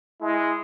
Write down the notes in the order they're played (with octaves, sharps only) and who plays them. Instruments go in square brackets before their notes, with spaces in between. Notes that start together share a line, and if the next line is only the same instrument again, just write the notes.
[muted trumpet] G#3 [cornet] E4